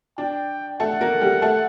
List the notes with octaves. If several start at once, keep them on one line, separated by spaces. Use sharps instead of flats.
D4 G5
A3 A4 F#5
A#3 A#4
G3 G4
A3 A4